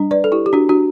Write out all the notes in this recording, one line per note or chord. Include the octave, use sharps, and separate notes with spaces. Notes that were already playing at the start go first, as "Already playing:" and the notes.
Already playing: G3 D4
B4 D5
A4
E4 G4
G4
D4 F#4
D4 F#4